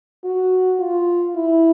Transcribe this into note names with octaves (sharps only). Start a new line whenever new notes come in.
F#4
F4
E4